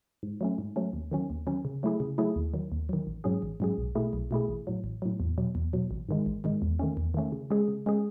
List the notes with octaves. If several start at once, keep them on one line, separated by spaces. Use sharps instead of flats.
G#2
F#3 A3 C#4
G#2
F#3 A3 C#4
D#2
D#3 F#3 C#4
D#2
D#3 F#3 C#4
C#3
F#3 A3 E4 G#4
C#3
F#3 A3 E4 G#4
D#2
D#3 F#3
D#2
D#3 F#3
A1
G#2 F#3 C#4 G#4
A1
G#2 F#3 C#4 G#4
B1
B2 A3 E4 G#4
B1
B2 A3 E4 G#4
A1
A2 F#3
A1
A2 F#3
E2
B2 F#3
E2
B2 F#3
A1
G#2 D#3 G#3
A1
G#2 D#3 G#3
E2
D#3 A3 C#4
E2
D#3 A3 C#4
C#3
G#3 C#4 G#4
C#3
G#3 C#4 G#4